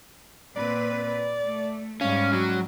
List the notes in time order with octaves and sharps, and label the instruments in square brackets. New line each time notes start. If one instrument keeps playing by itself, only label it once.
[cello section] A#2 C4 B4 [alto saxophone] D5
[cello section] A3
[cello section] G#2 G3 G#3 [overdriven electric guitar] C#4 [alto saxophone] F5
[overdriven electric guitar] F#3 [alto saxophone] C#4